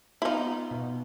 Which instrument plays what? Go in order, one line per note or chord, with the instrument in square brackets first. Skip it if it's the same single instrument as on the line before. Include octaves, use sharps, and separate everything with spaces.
[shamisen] E4
[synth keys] B3 [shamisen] D#4 F4
[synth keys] B2